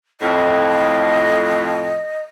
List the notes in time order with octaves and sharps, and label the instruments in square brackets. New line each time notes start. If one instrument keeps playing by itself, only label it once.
[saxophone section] F2 A2 [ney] D#5